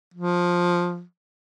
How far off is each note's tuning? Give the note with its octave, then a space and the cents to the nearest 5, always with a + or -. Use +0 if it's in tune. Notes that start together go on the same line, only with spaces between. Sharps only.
F3 +10